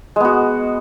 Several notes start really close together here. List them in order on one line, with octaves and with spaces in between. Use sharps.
G#3 B3 F#4